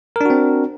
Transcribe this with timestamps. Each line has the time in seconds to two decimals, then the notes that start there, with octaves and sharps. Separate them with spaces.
0.16 A#4
0.21 D4
0.25 F#4
0.30 C4